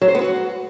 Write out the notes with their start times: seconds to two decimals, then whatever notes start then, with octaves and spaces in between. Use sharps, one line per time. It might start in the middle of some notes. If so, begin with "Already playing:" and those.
0.01 F#3
0.08 C5
0.15 B3
0.21 F#4